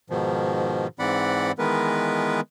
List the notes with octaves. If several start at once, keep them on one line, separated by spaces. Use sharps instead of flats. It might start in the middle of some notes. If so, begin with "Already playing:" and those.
G#2 B2 D#3 F3
G#2 E3 C4 D5 F#5 B5
D#3 E3 G#3 B3 A#4 B4